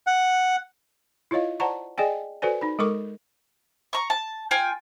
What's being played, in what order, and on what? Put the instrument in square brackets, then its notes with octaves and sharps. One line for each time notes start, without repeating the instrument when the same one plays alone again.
[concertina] F#5
[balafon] E4 F4 C#5 D#5 F5
C5 D5 F#5 A5 A#5 C#6
G#4 D5 D#5 G5 G#5
F#4 A4 B4 C5 D5 G#5
D#4 B5
G#3 A4 A#4 C#6 D6
[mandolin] A#5 C#6
A5
F4 G5 G#5